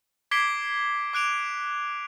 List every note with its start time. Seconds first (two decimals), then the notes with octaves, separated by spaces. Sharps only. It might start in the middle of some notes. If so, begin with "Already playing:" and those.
0.31 D6 G#6 B6 C7 D7 G7
1.13 D6 F#6 D7 F7